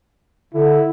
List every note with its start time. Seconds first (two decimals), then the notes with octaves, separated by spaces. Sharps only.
0.54 D3 E4